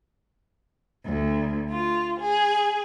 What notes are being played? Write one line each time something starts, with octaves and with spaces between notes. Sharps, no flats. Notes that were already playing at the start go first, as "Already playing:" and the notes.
D2
F4
G#4